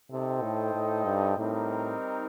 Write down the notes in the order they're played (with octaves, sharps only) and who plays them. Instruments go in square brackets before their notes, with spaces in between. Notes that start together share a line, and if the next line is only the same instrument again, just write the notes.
[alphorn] C3 [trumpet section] D#4 A4 C5 D#5 G5
[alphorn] A2
A2
G2
[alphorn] A2 [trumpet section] G3 C4 D#4 A#4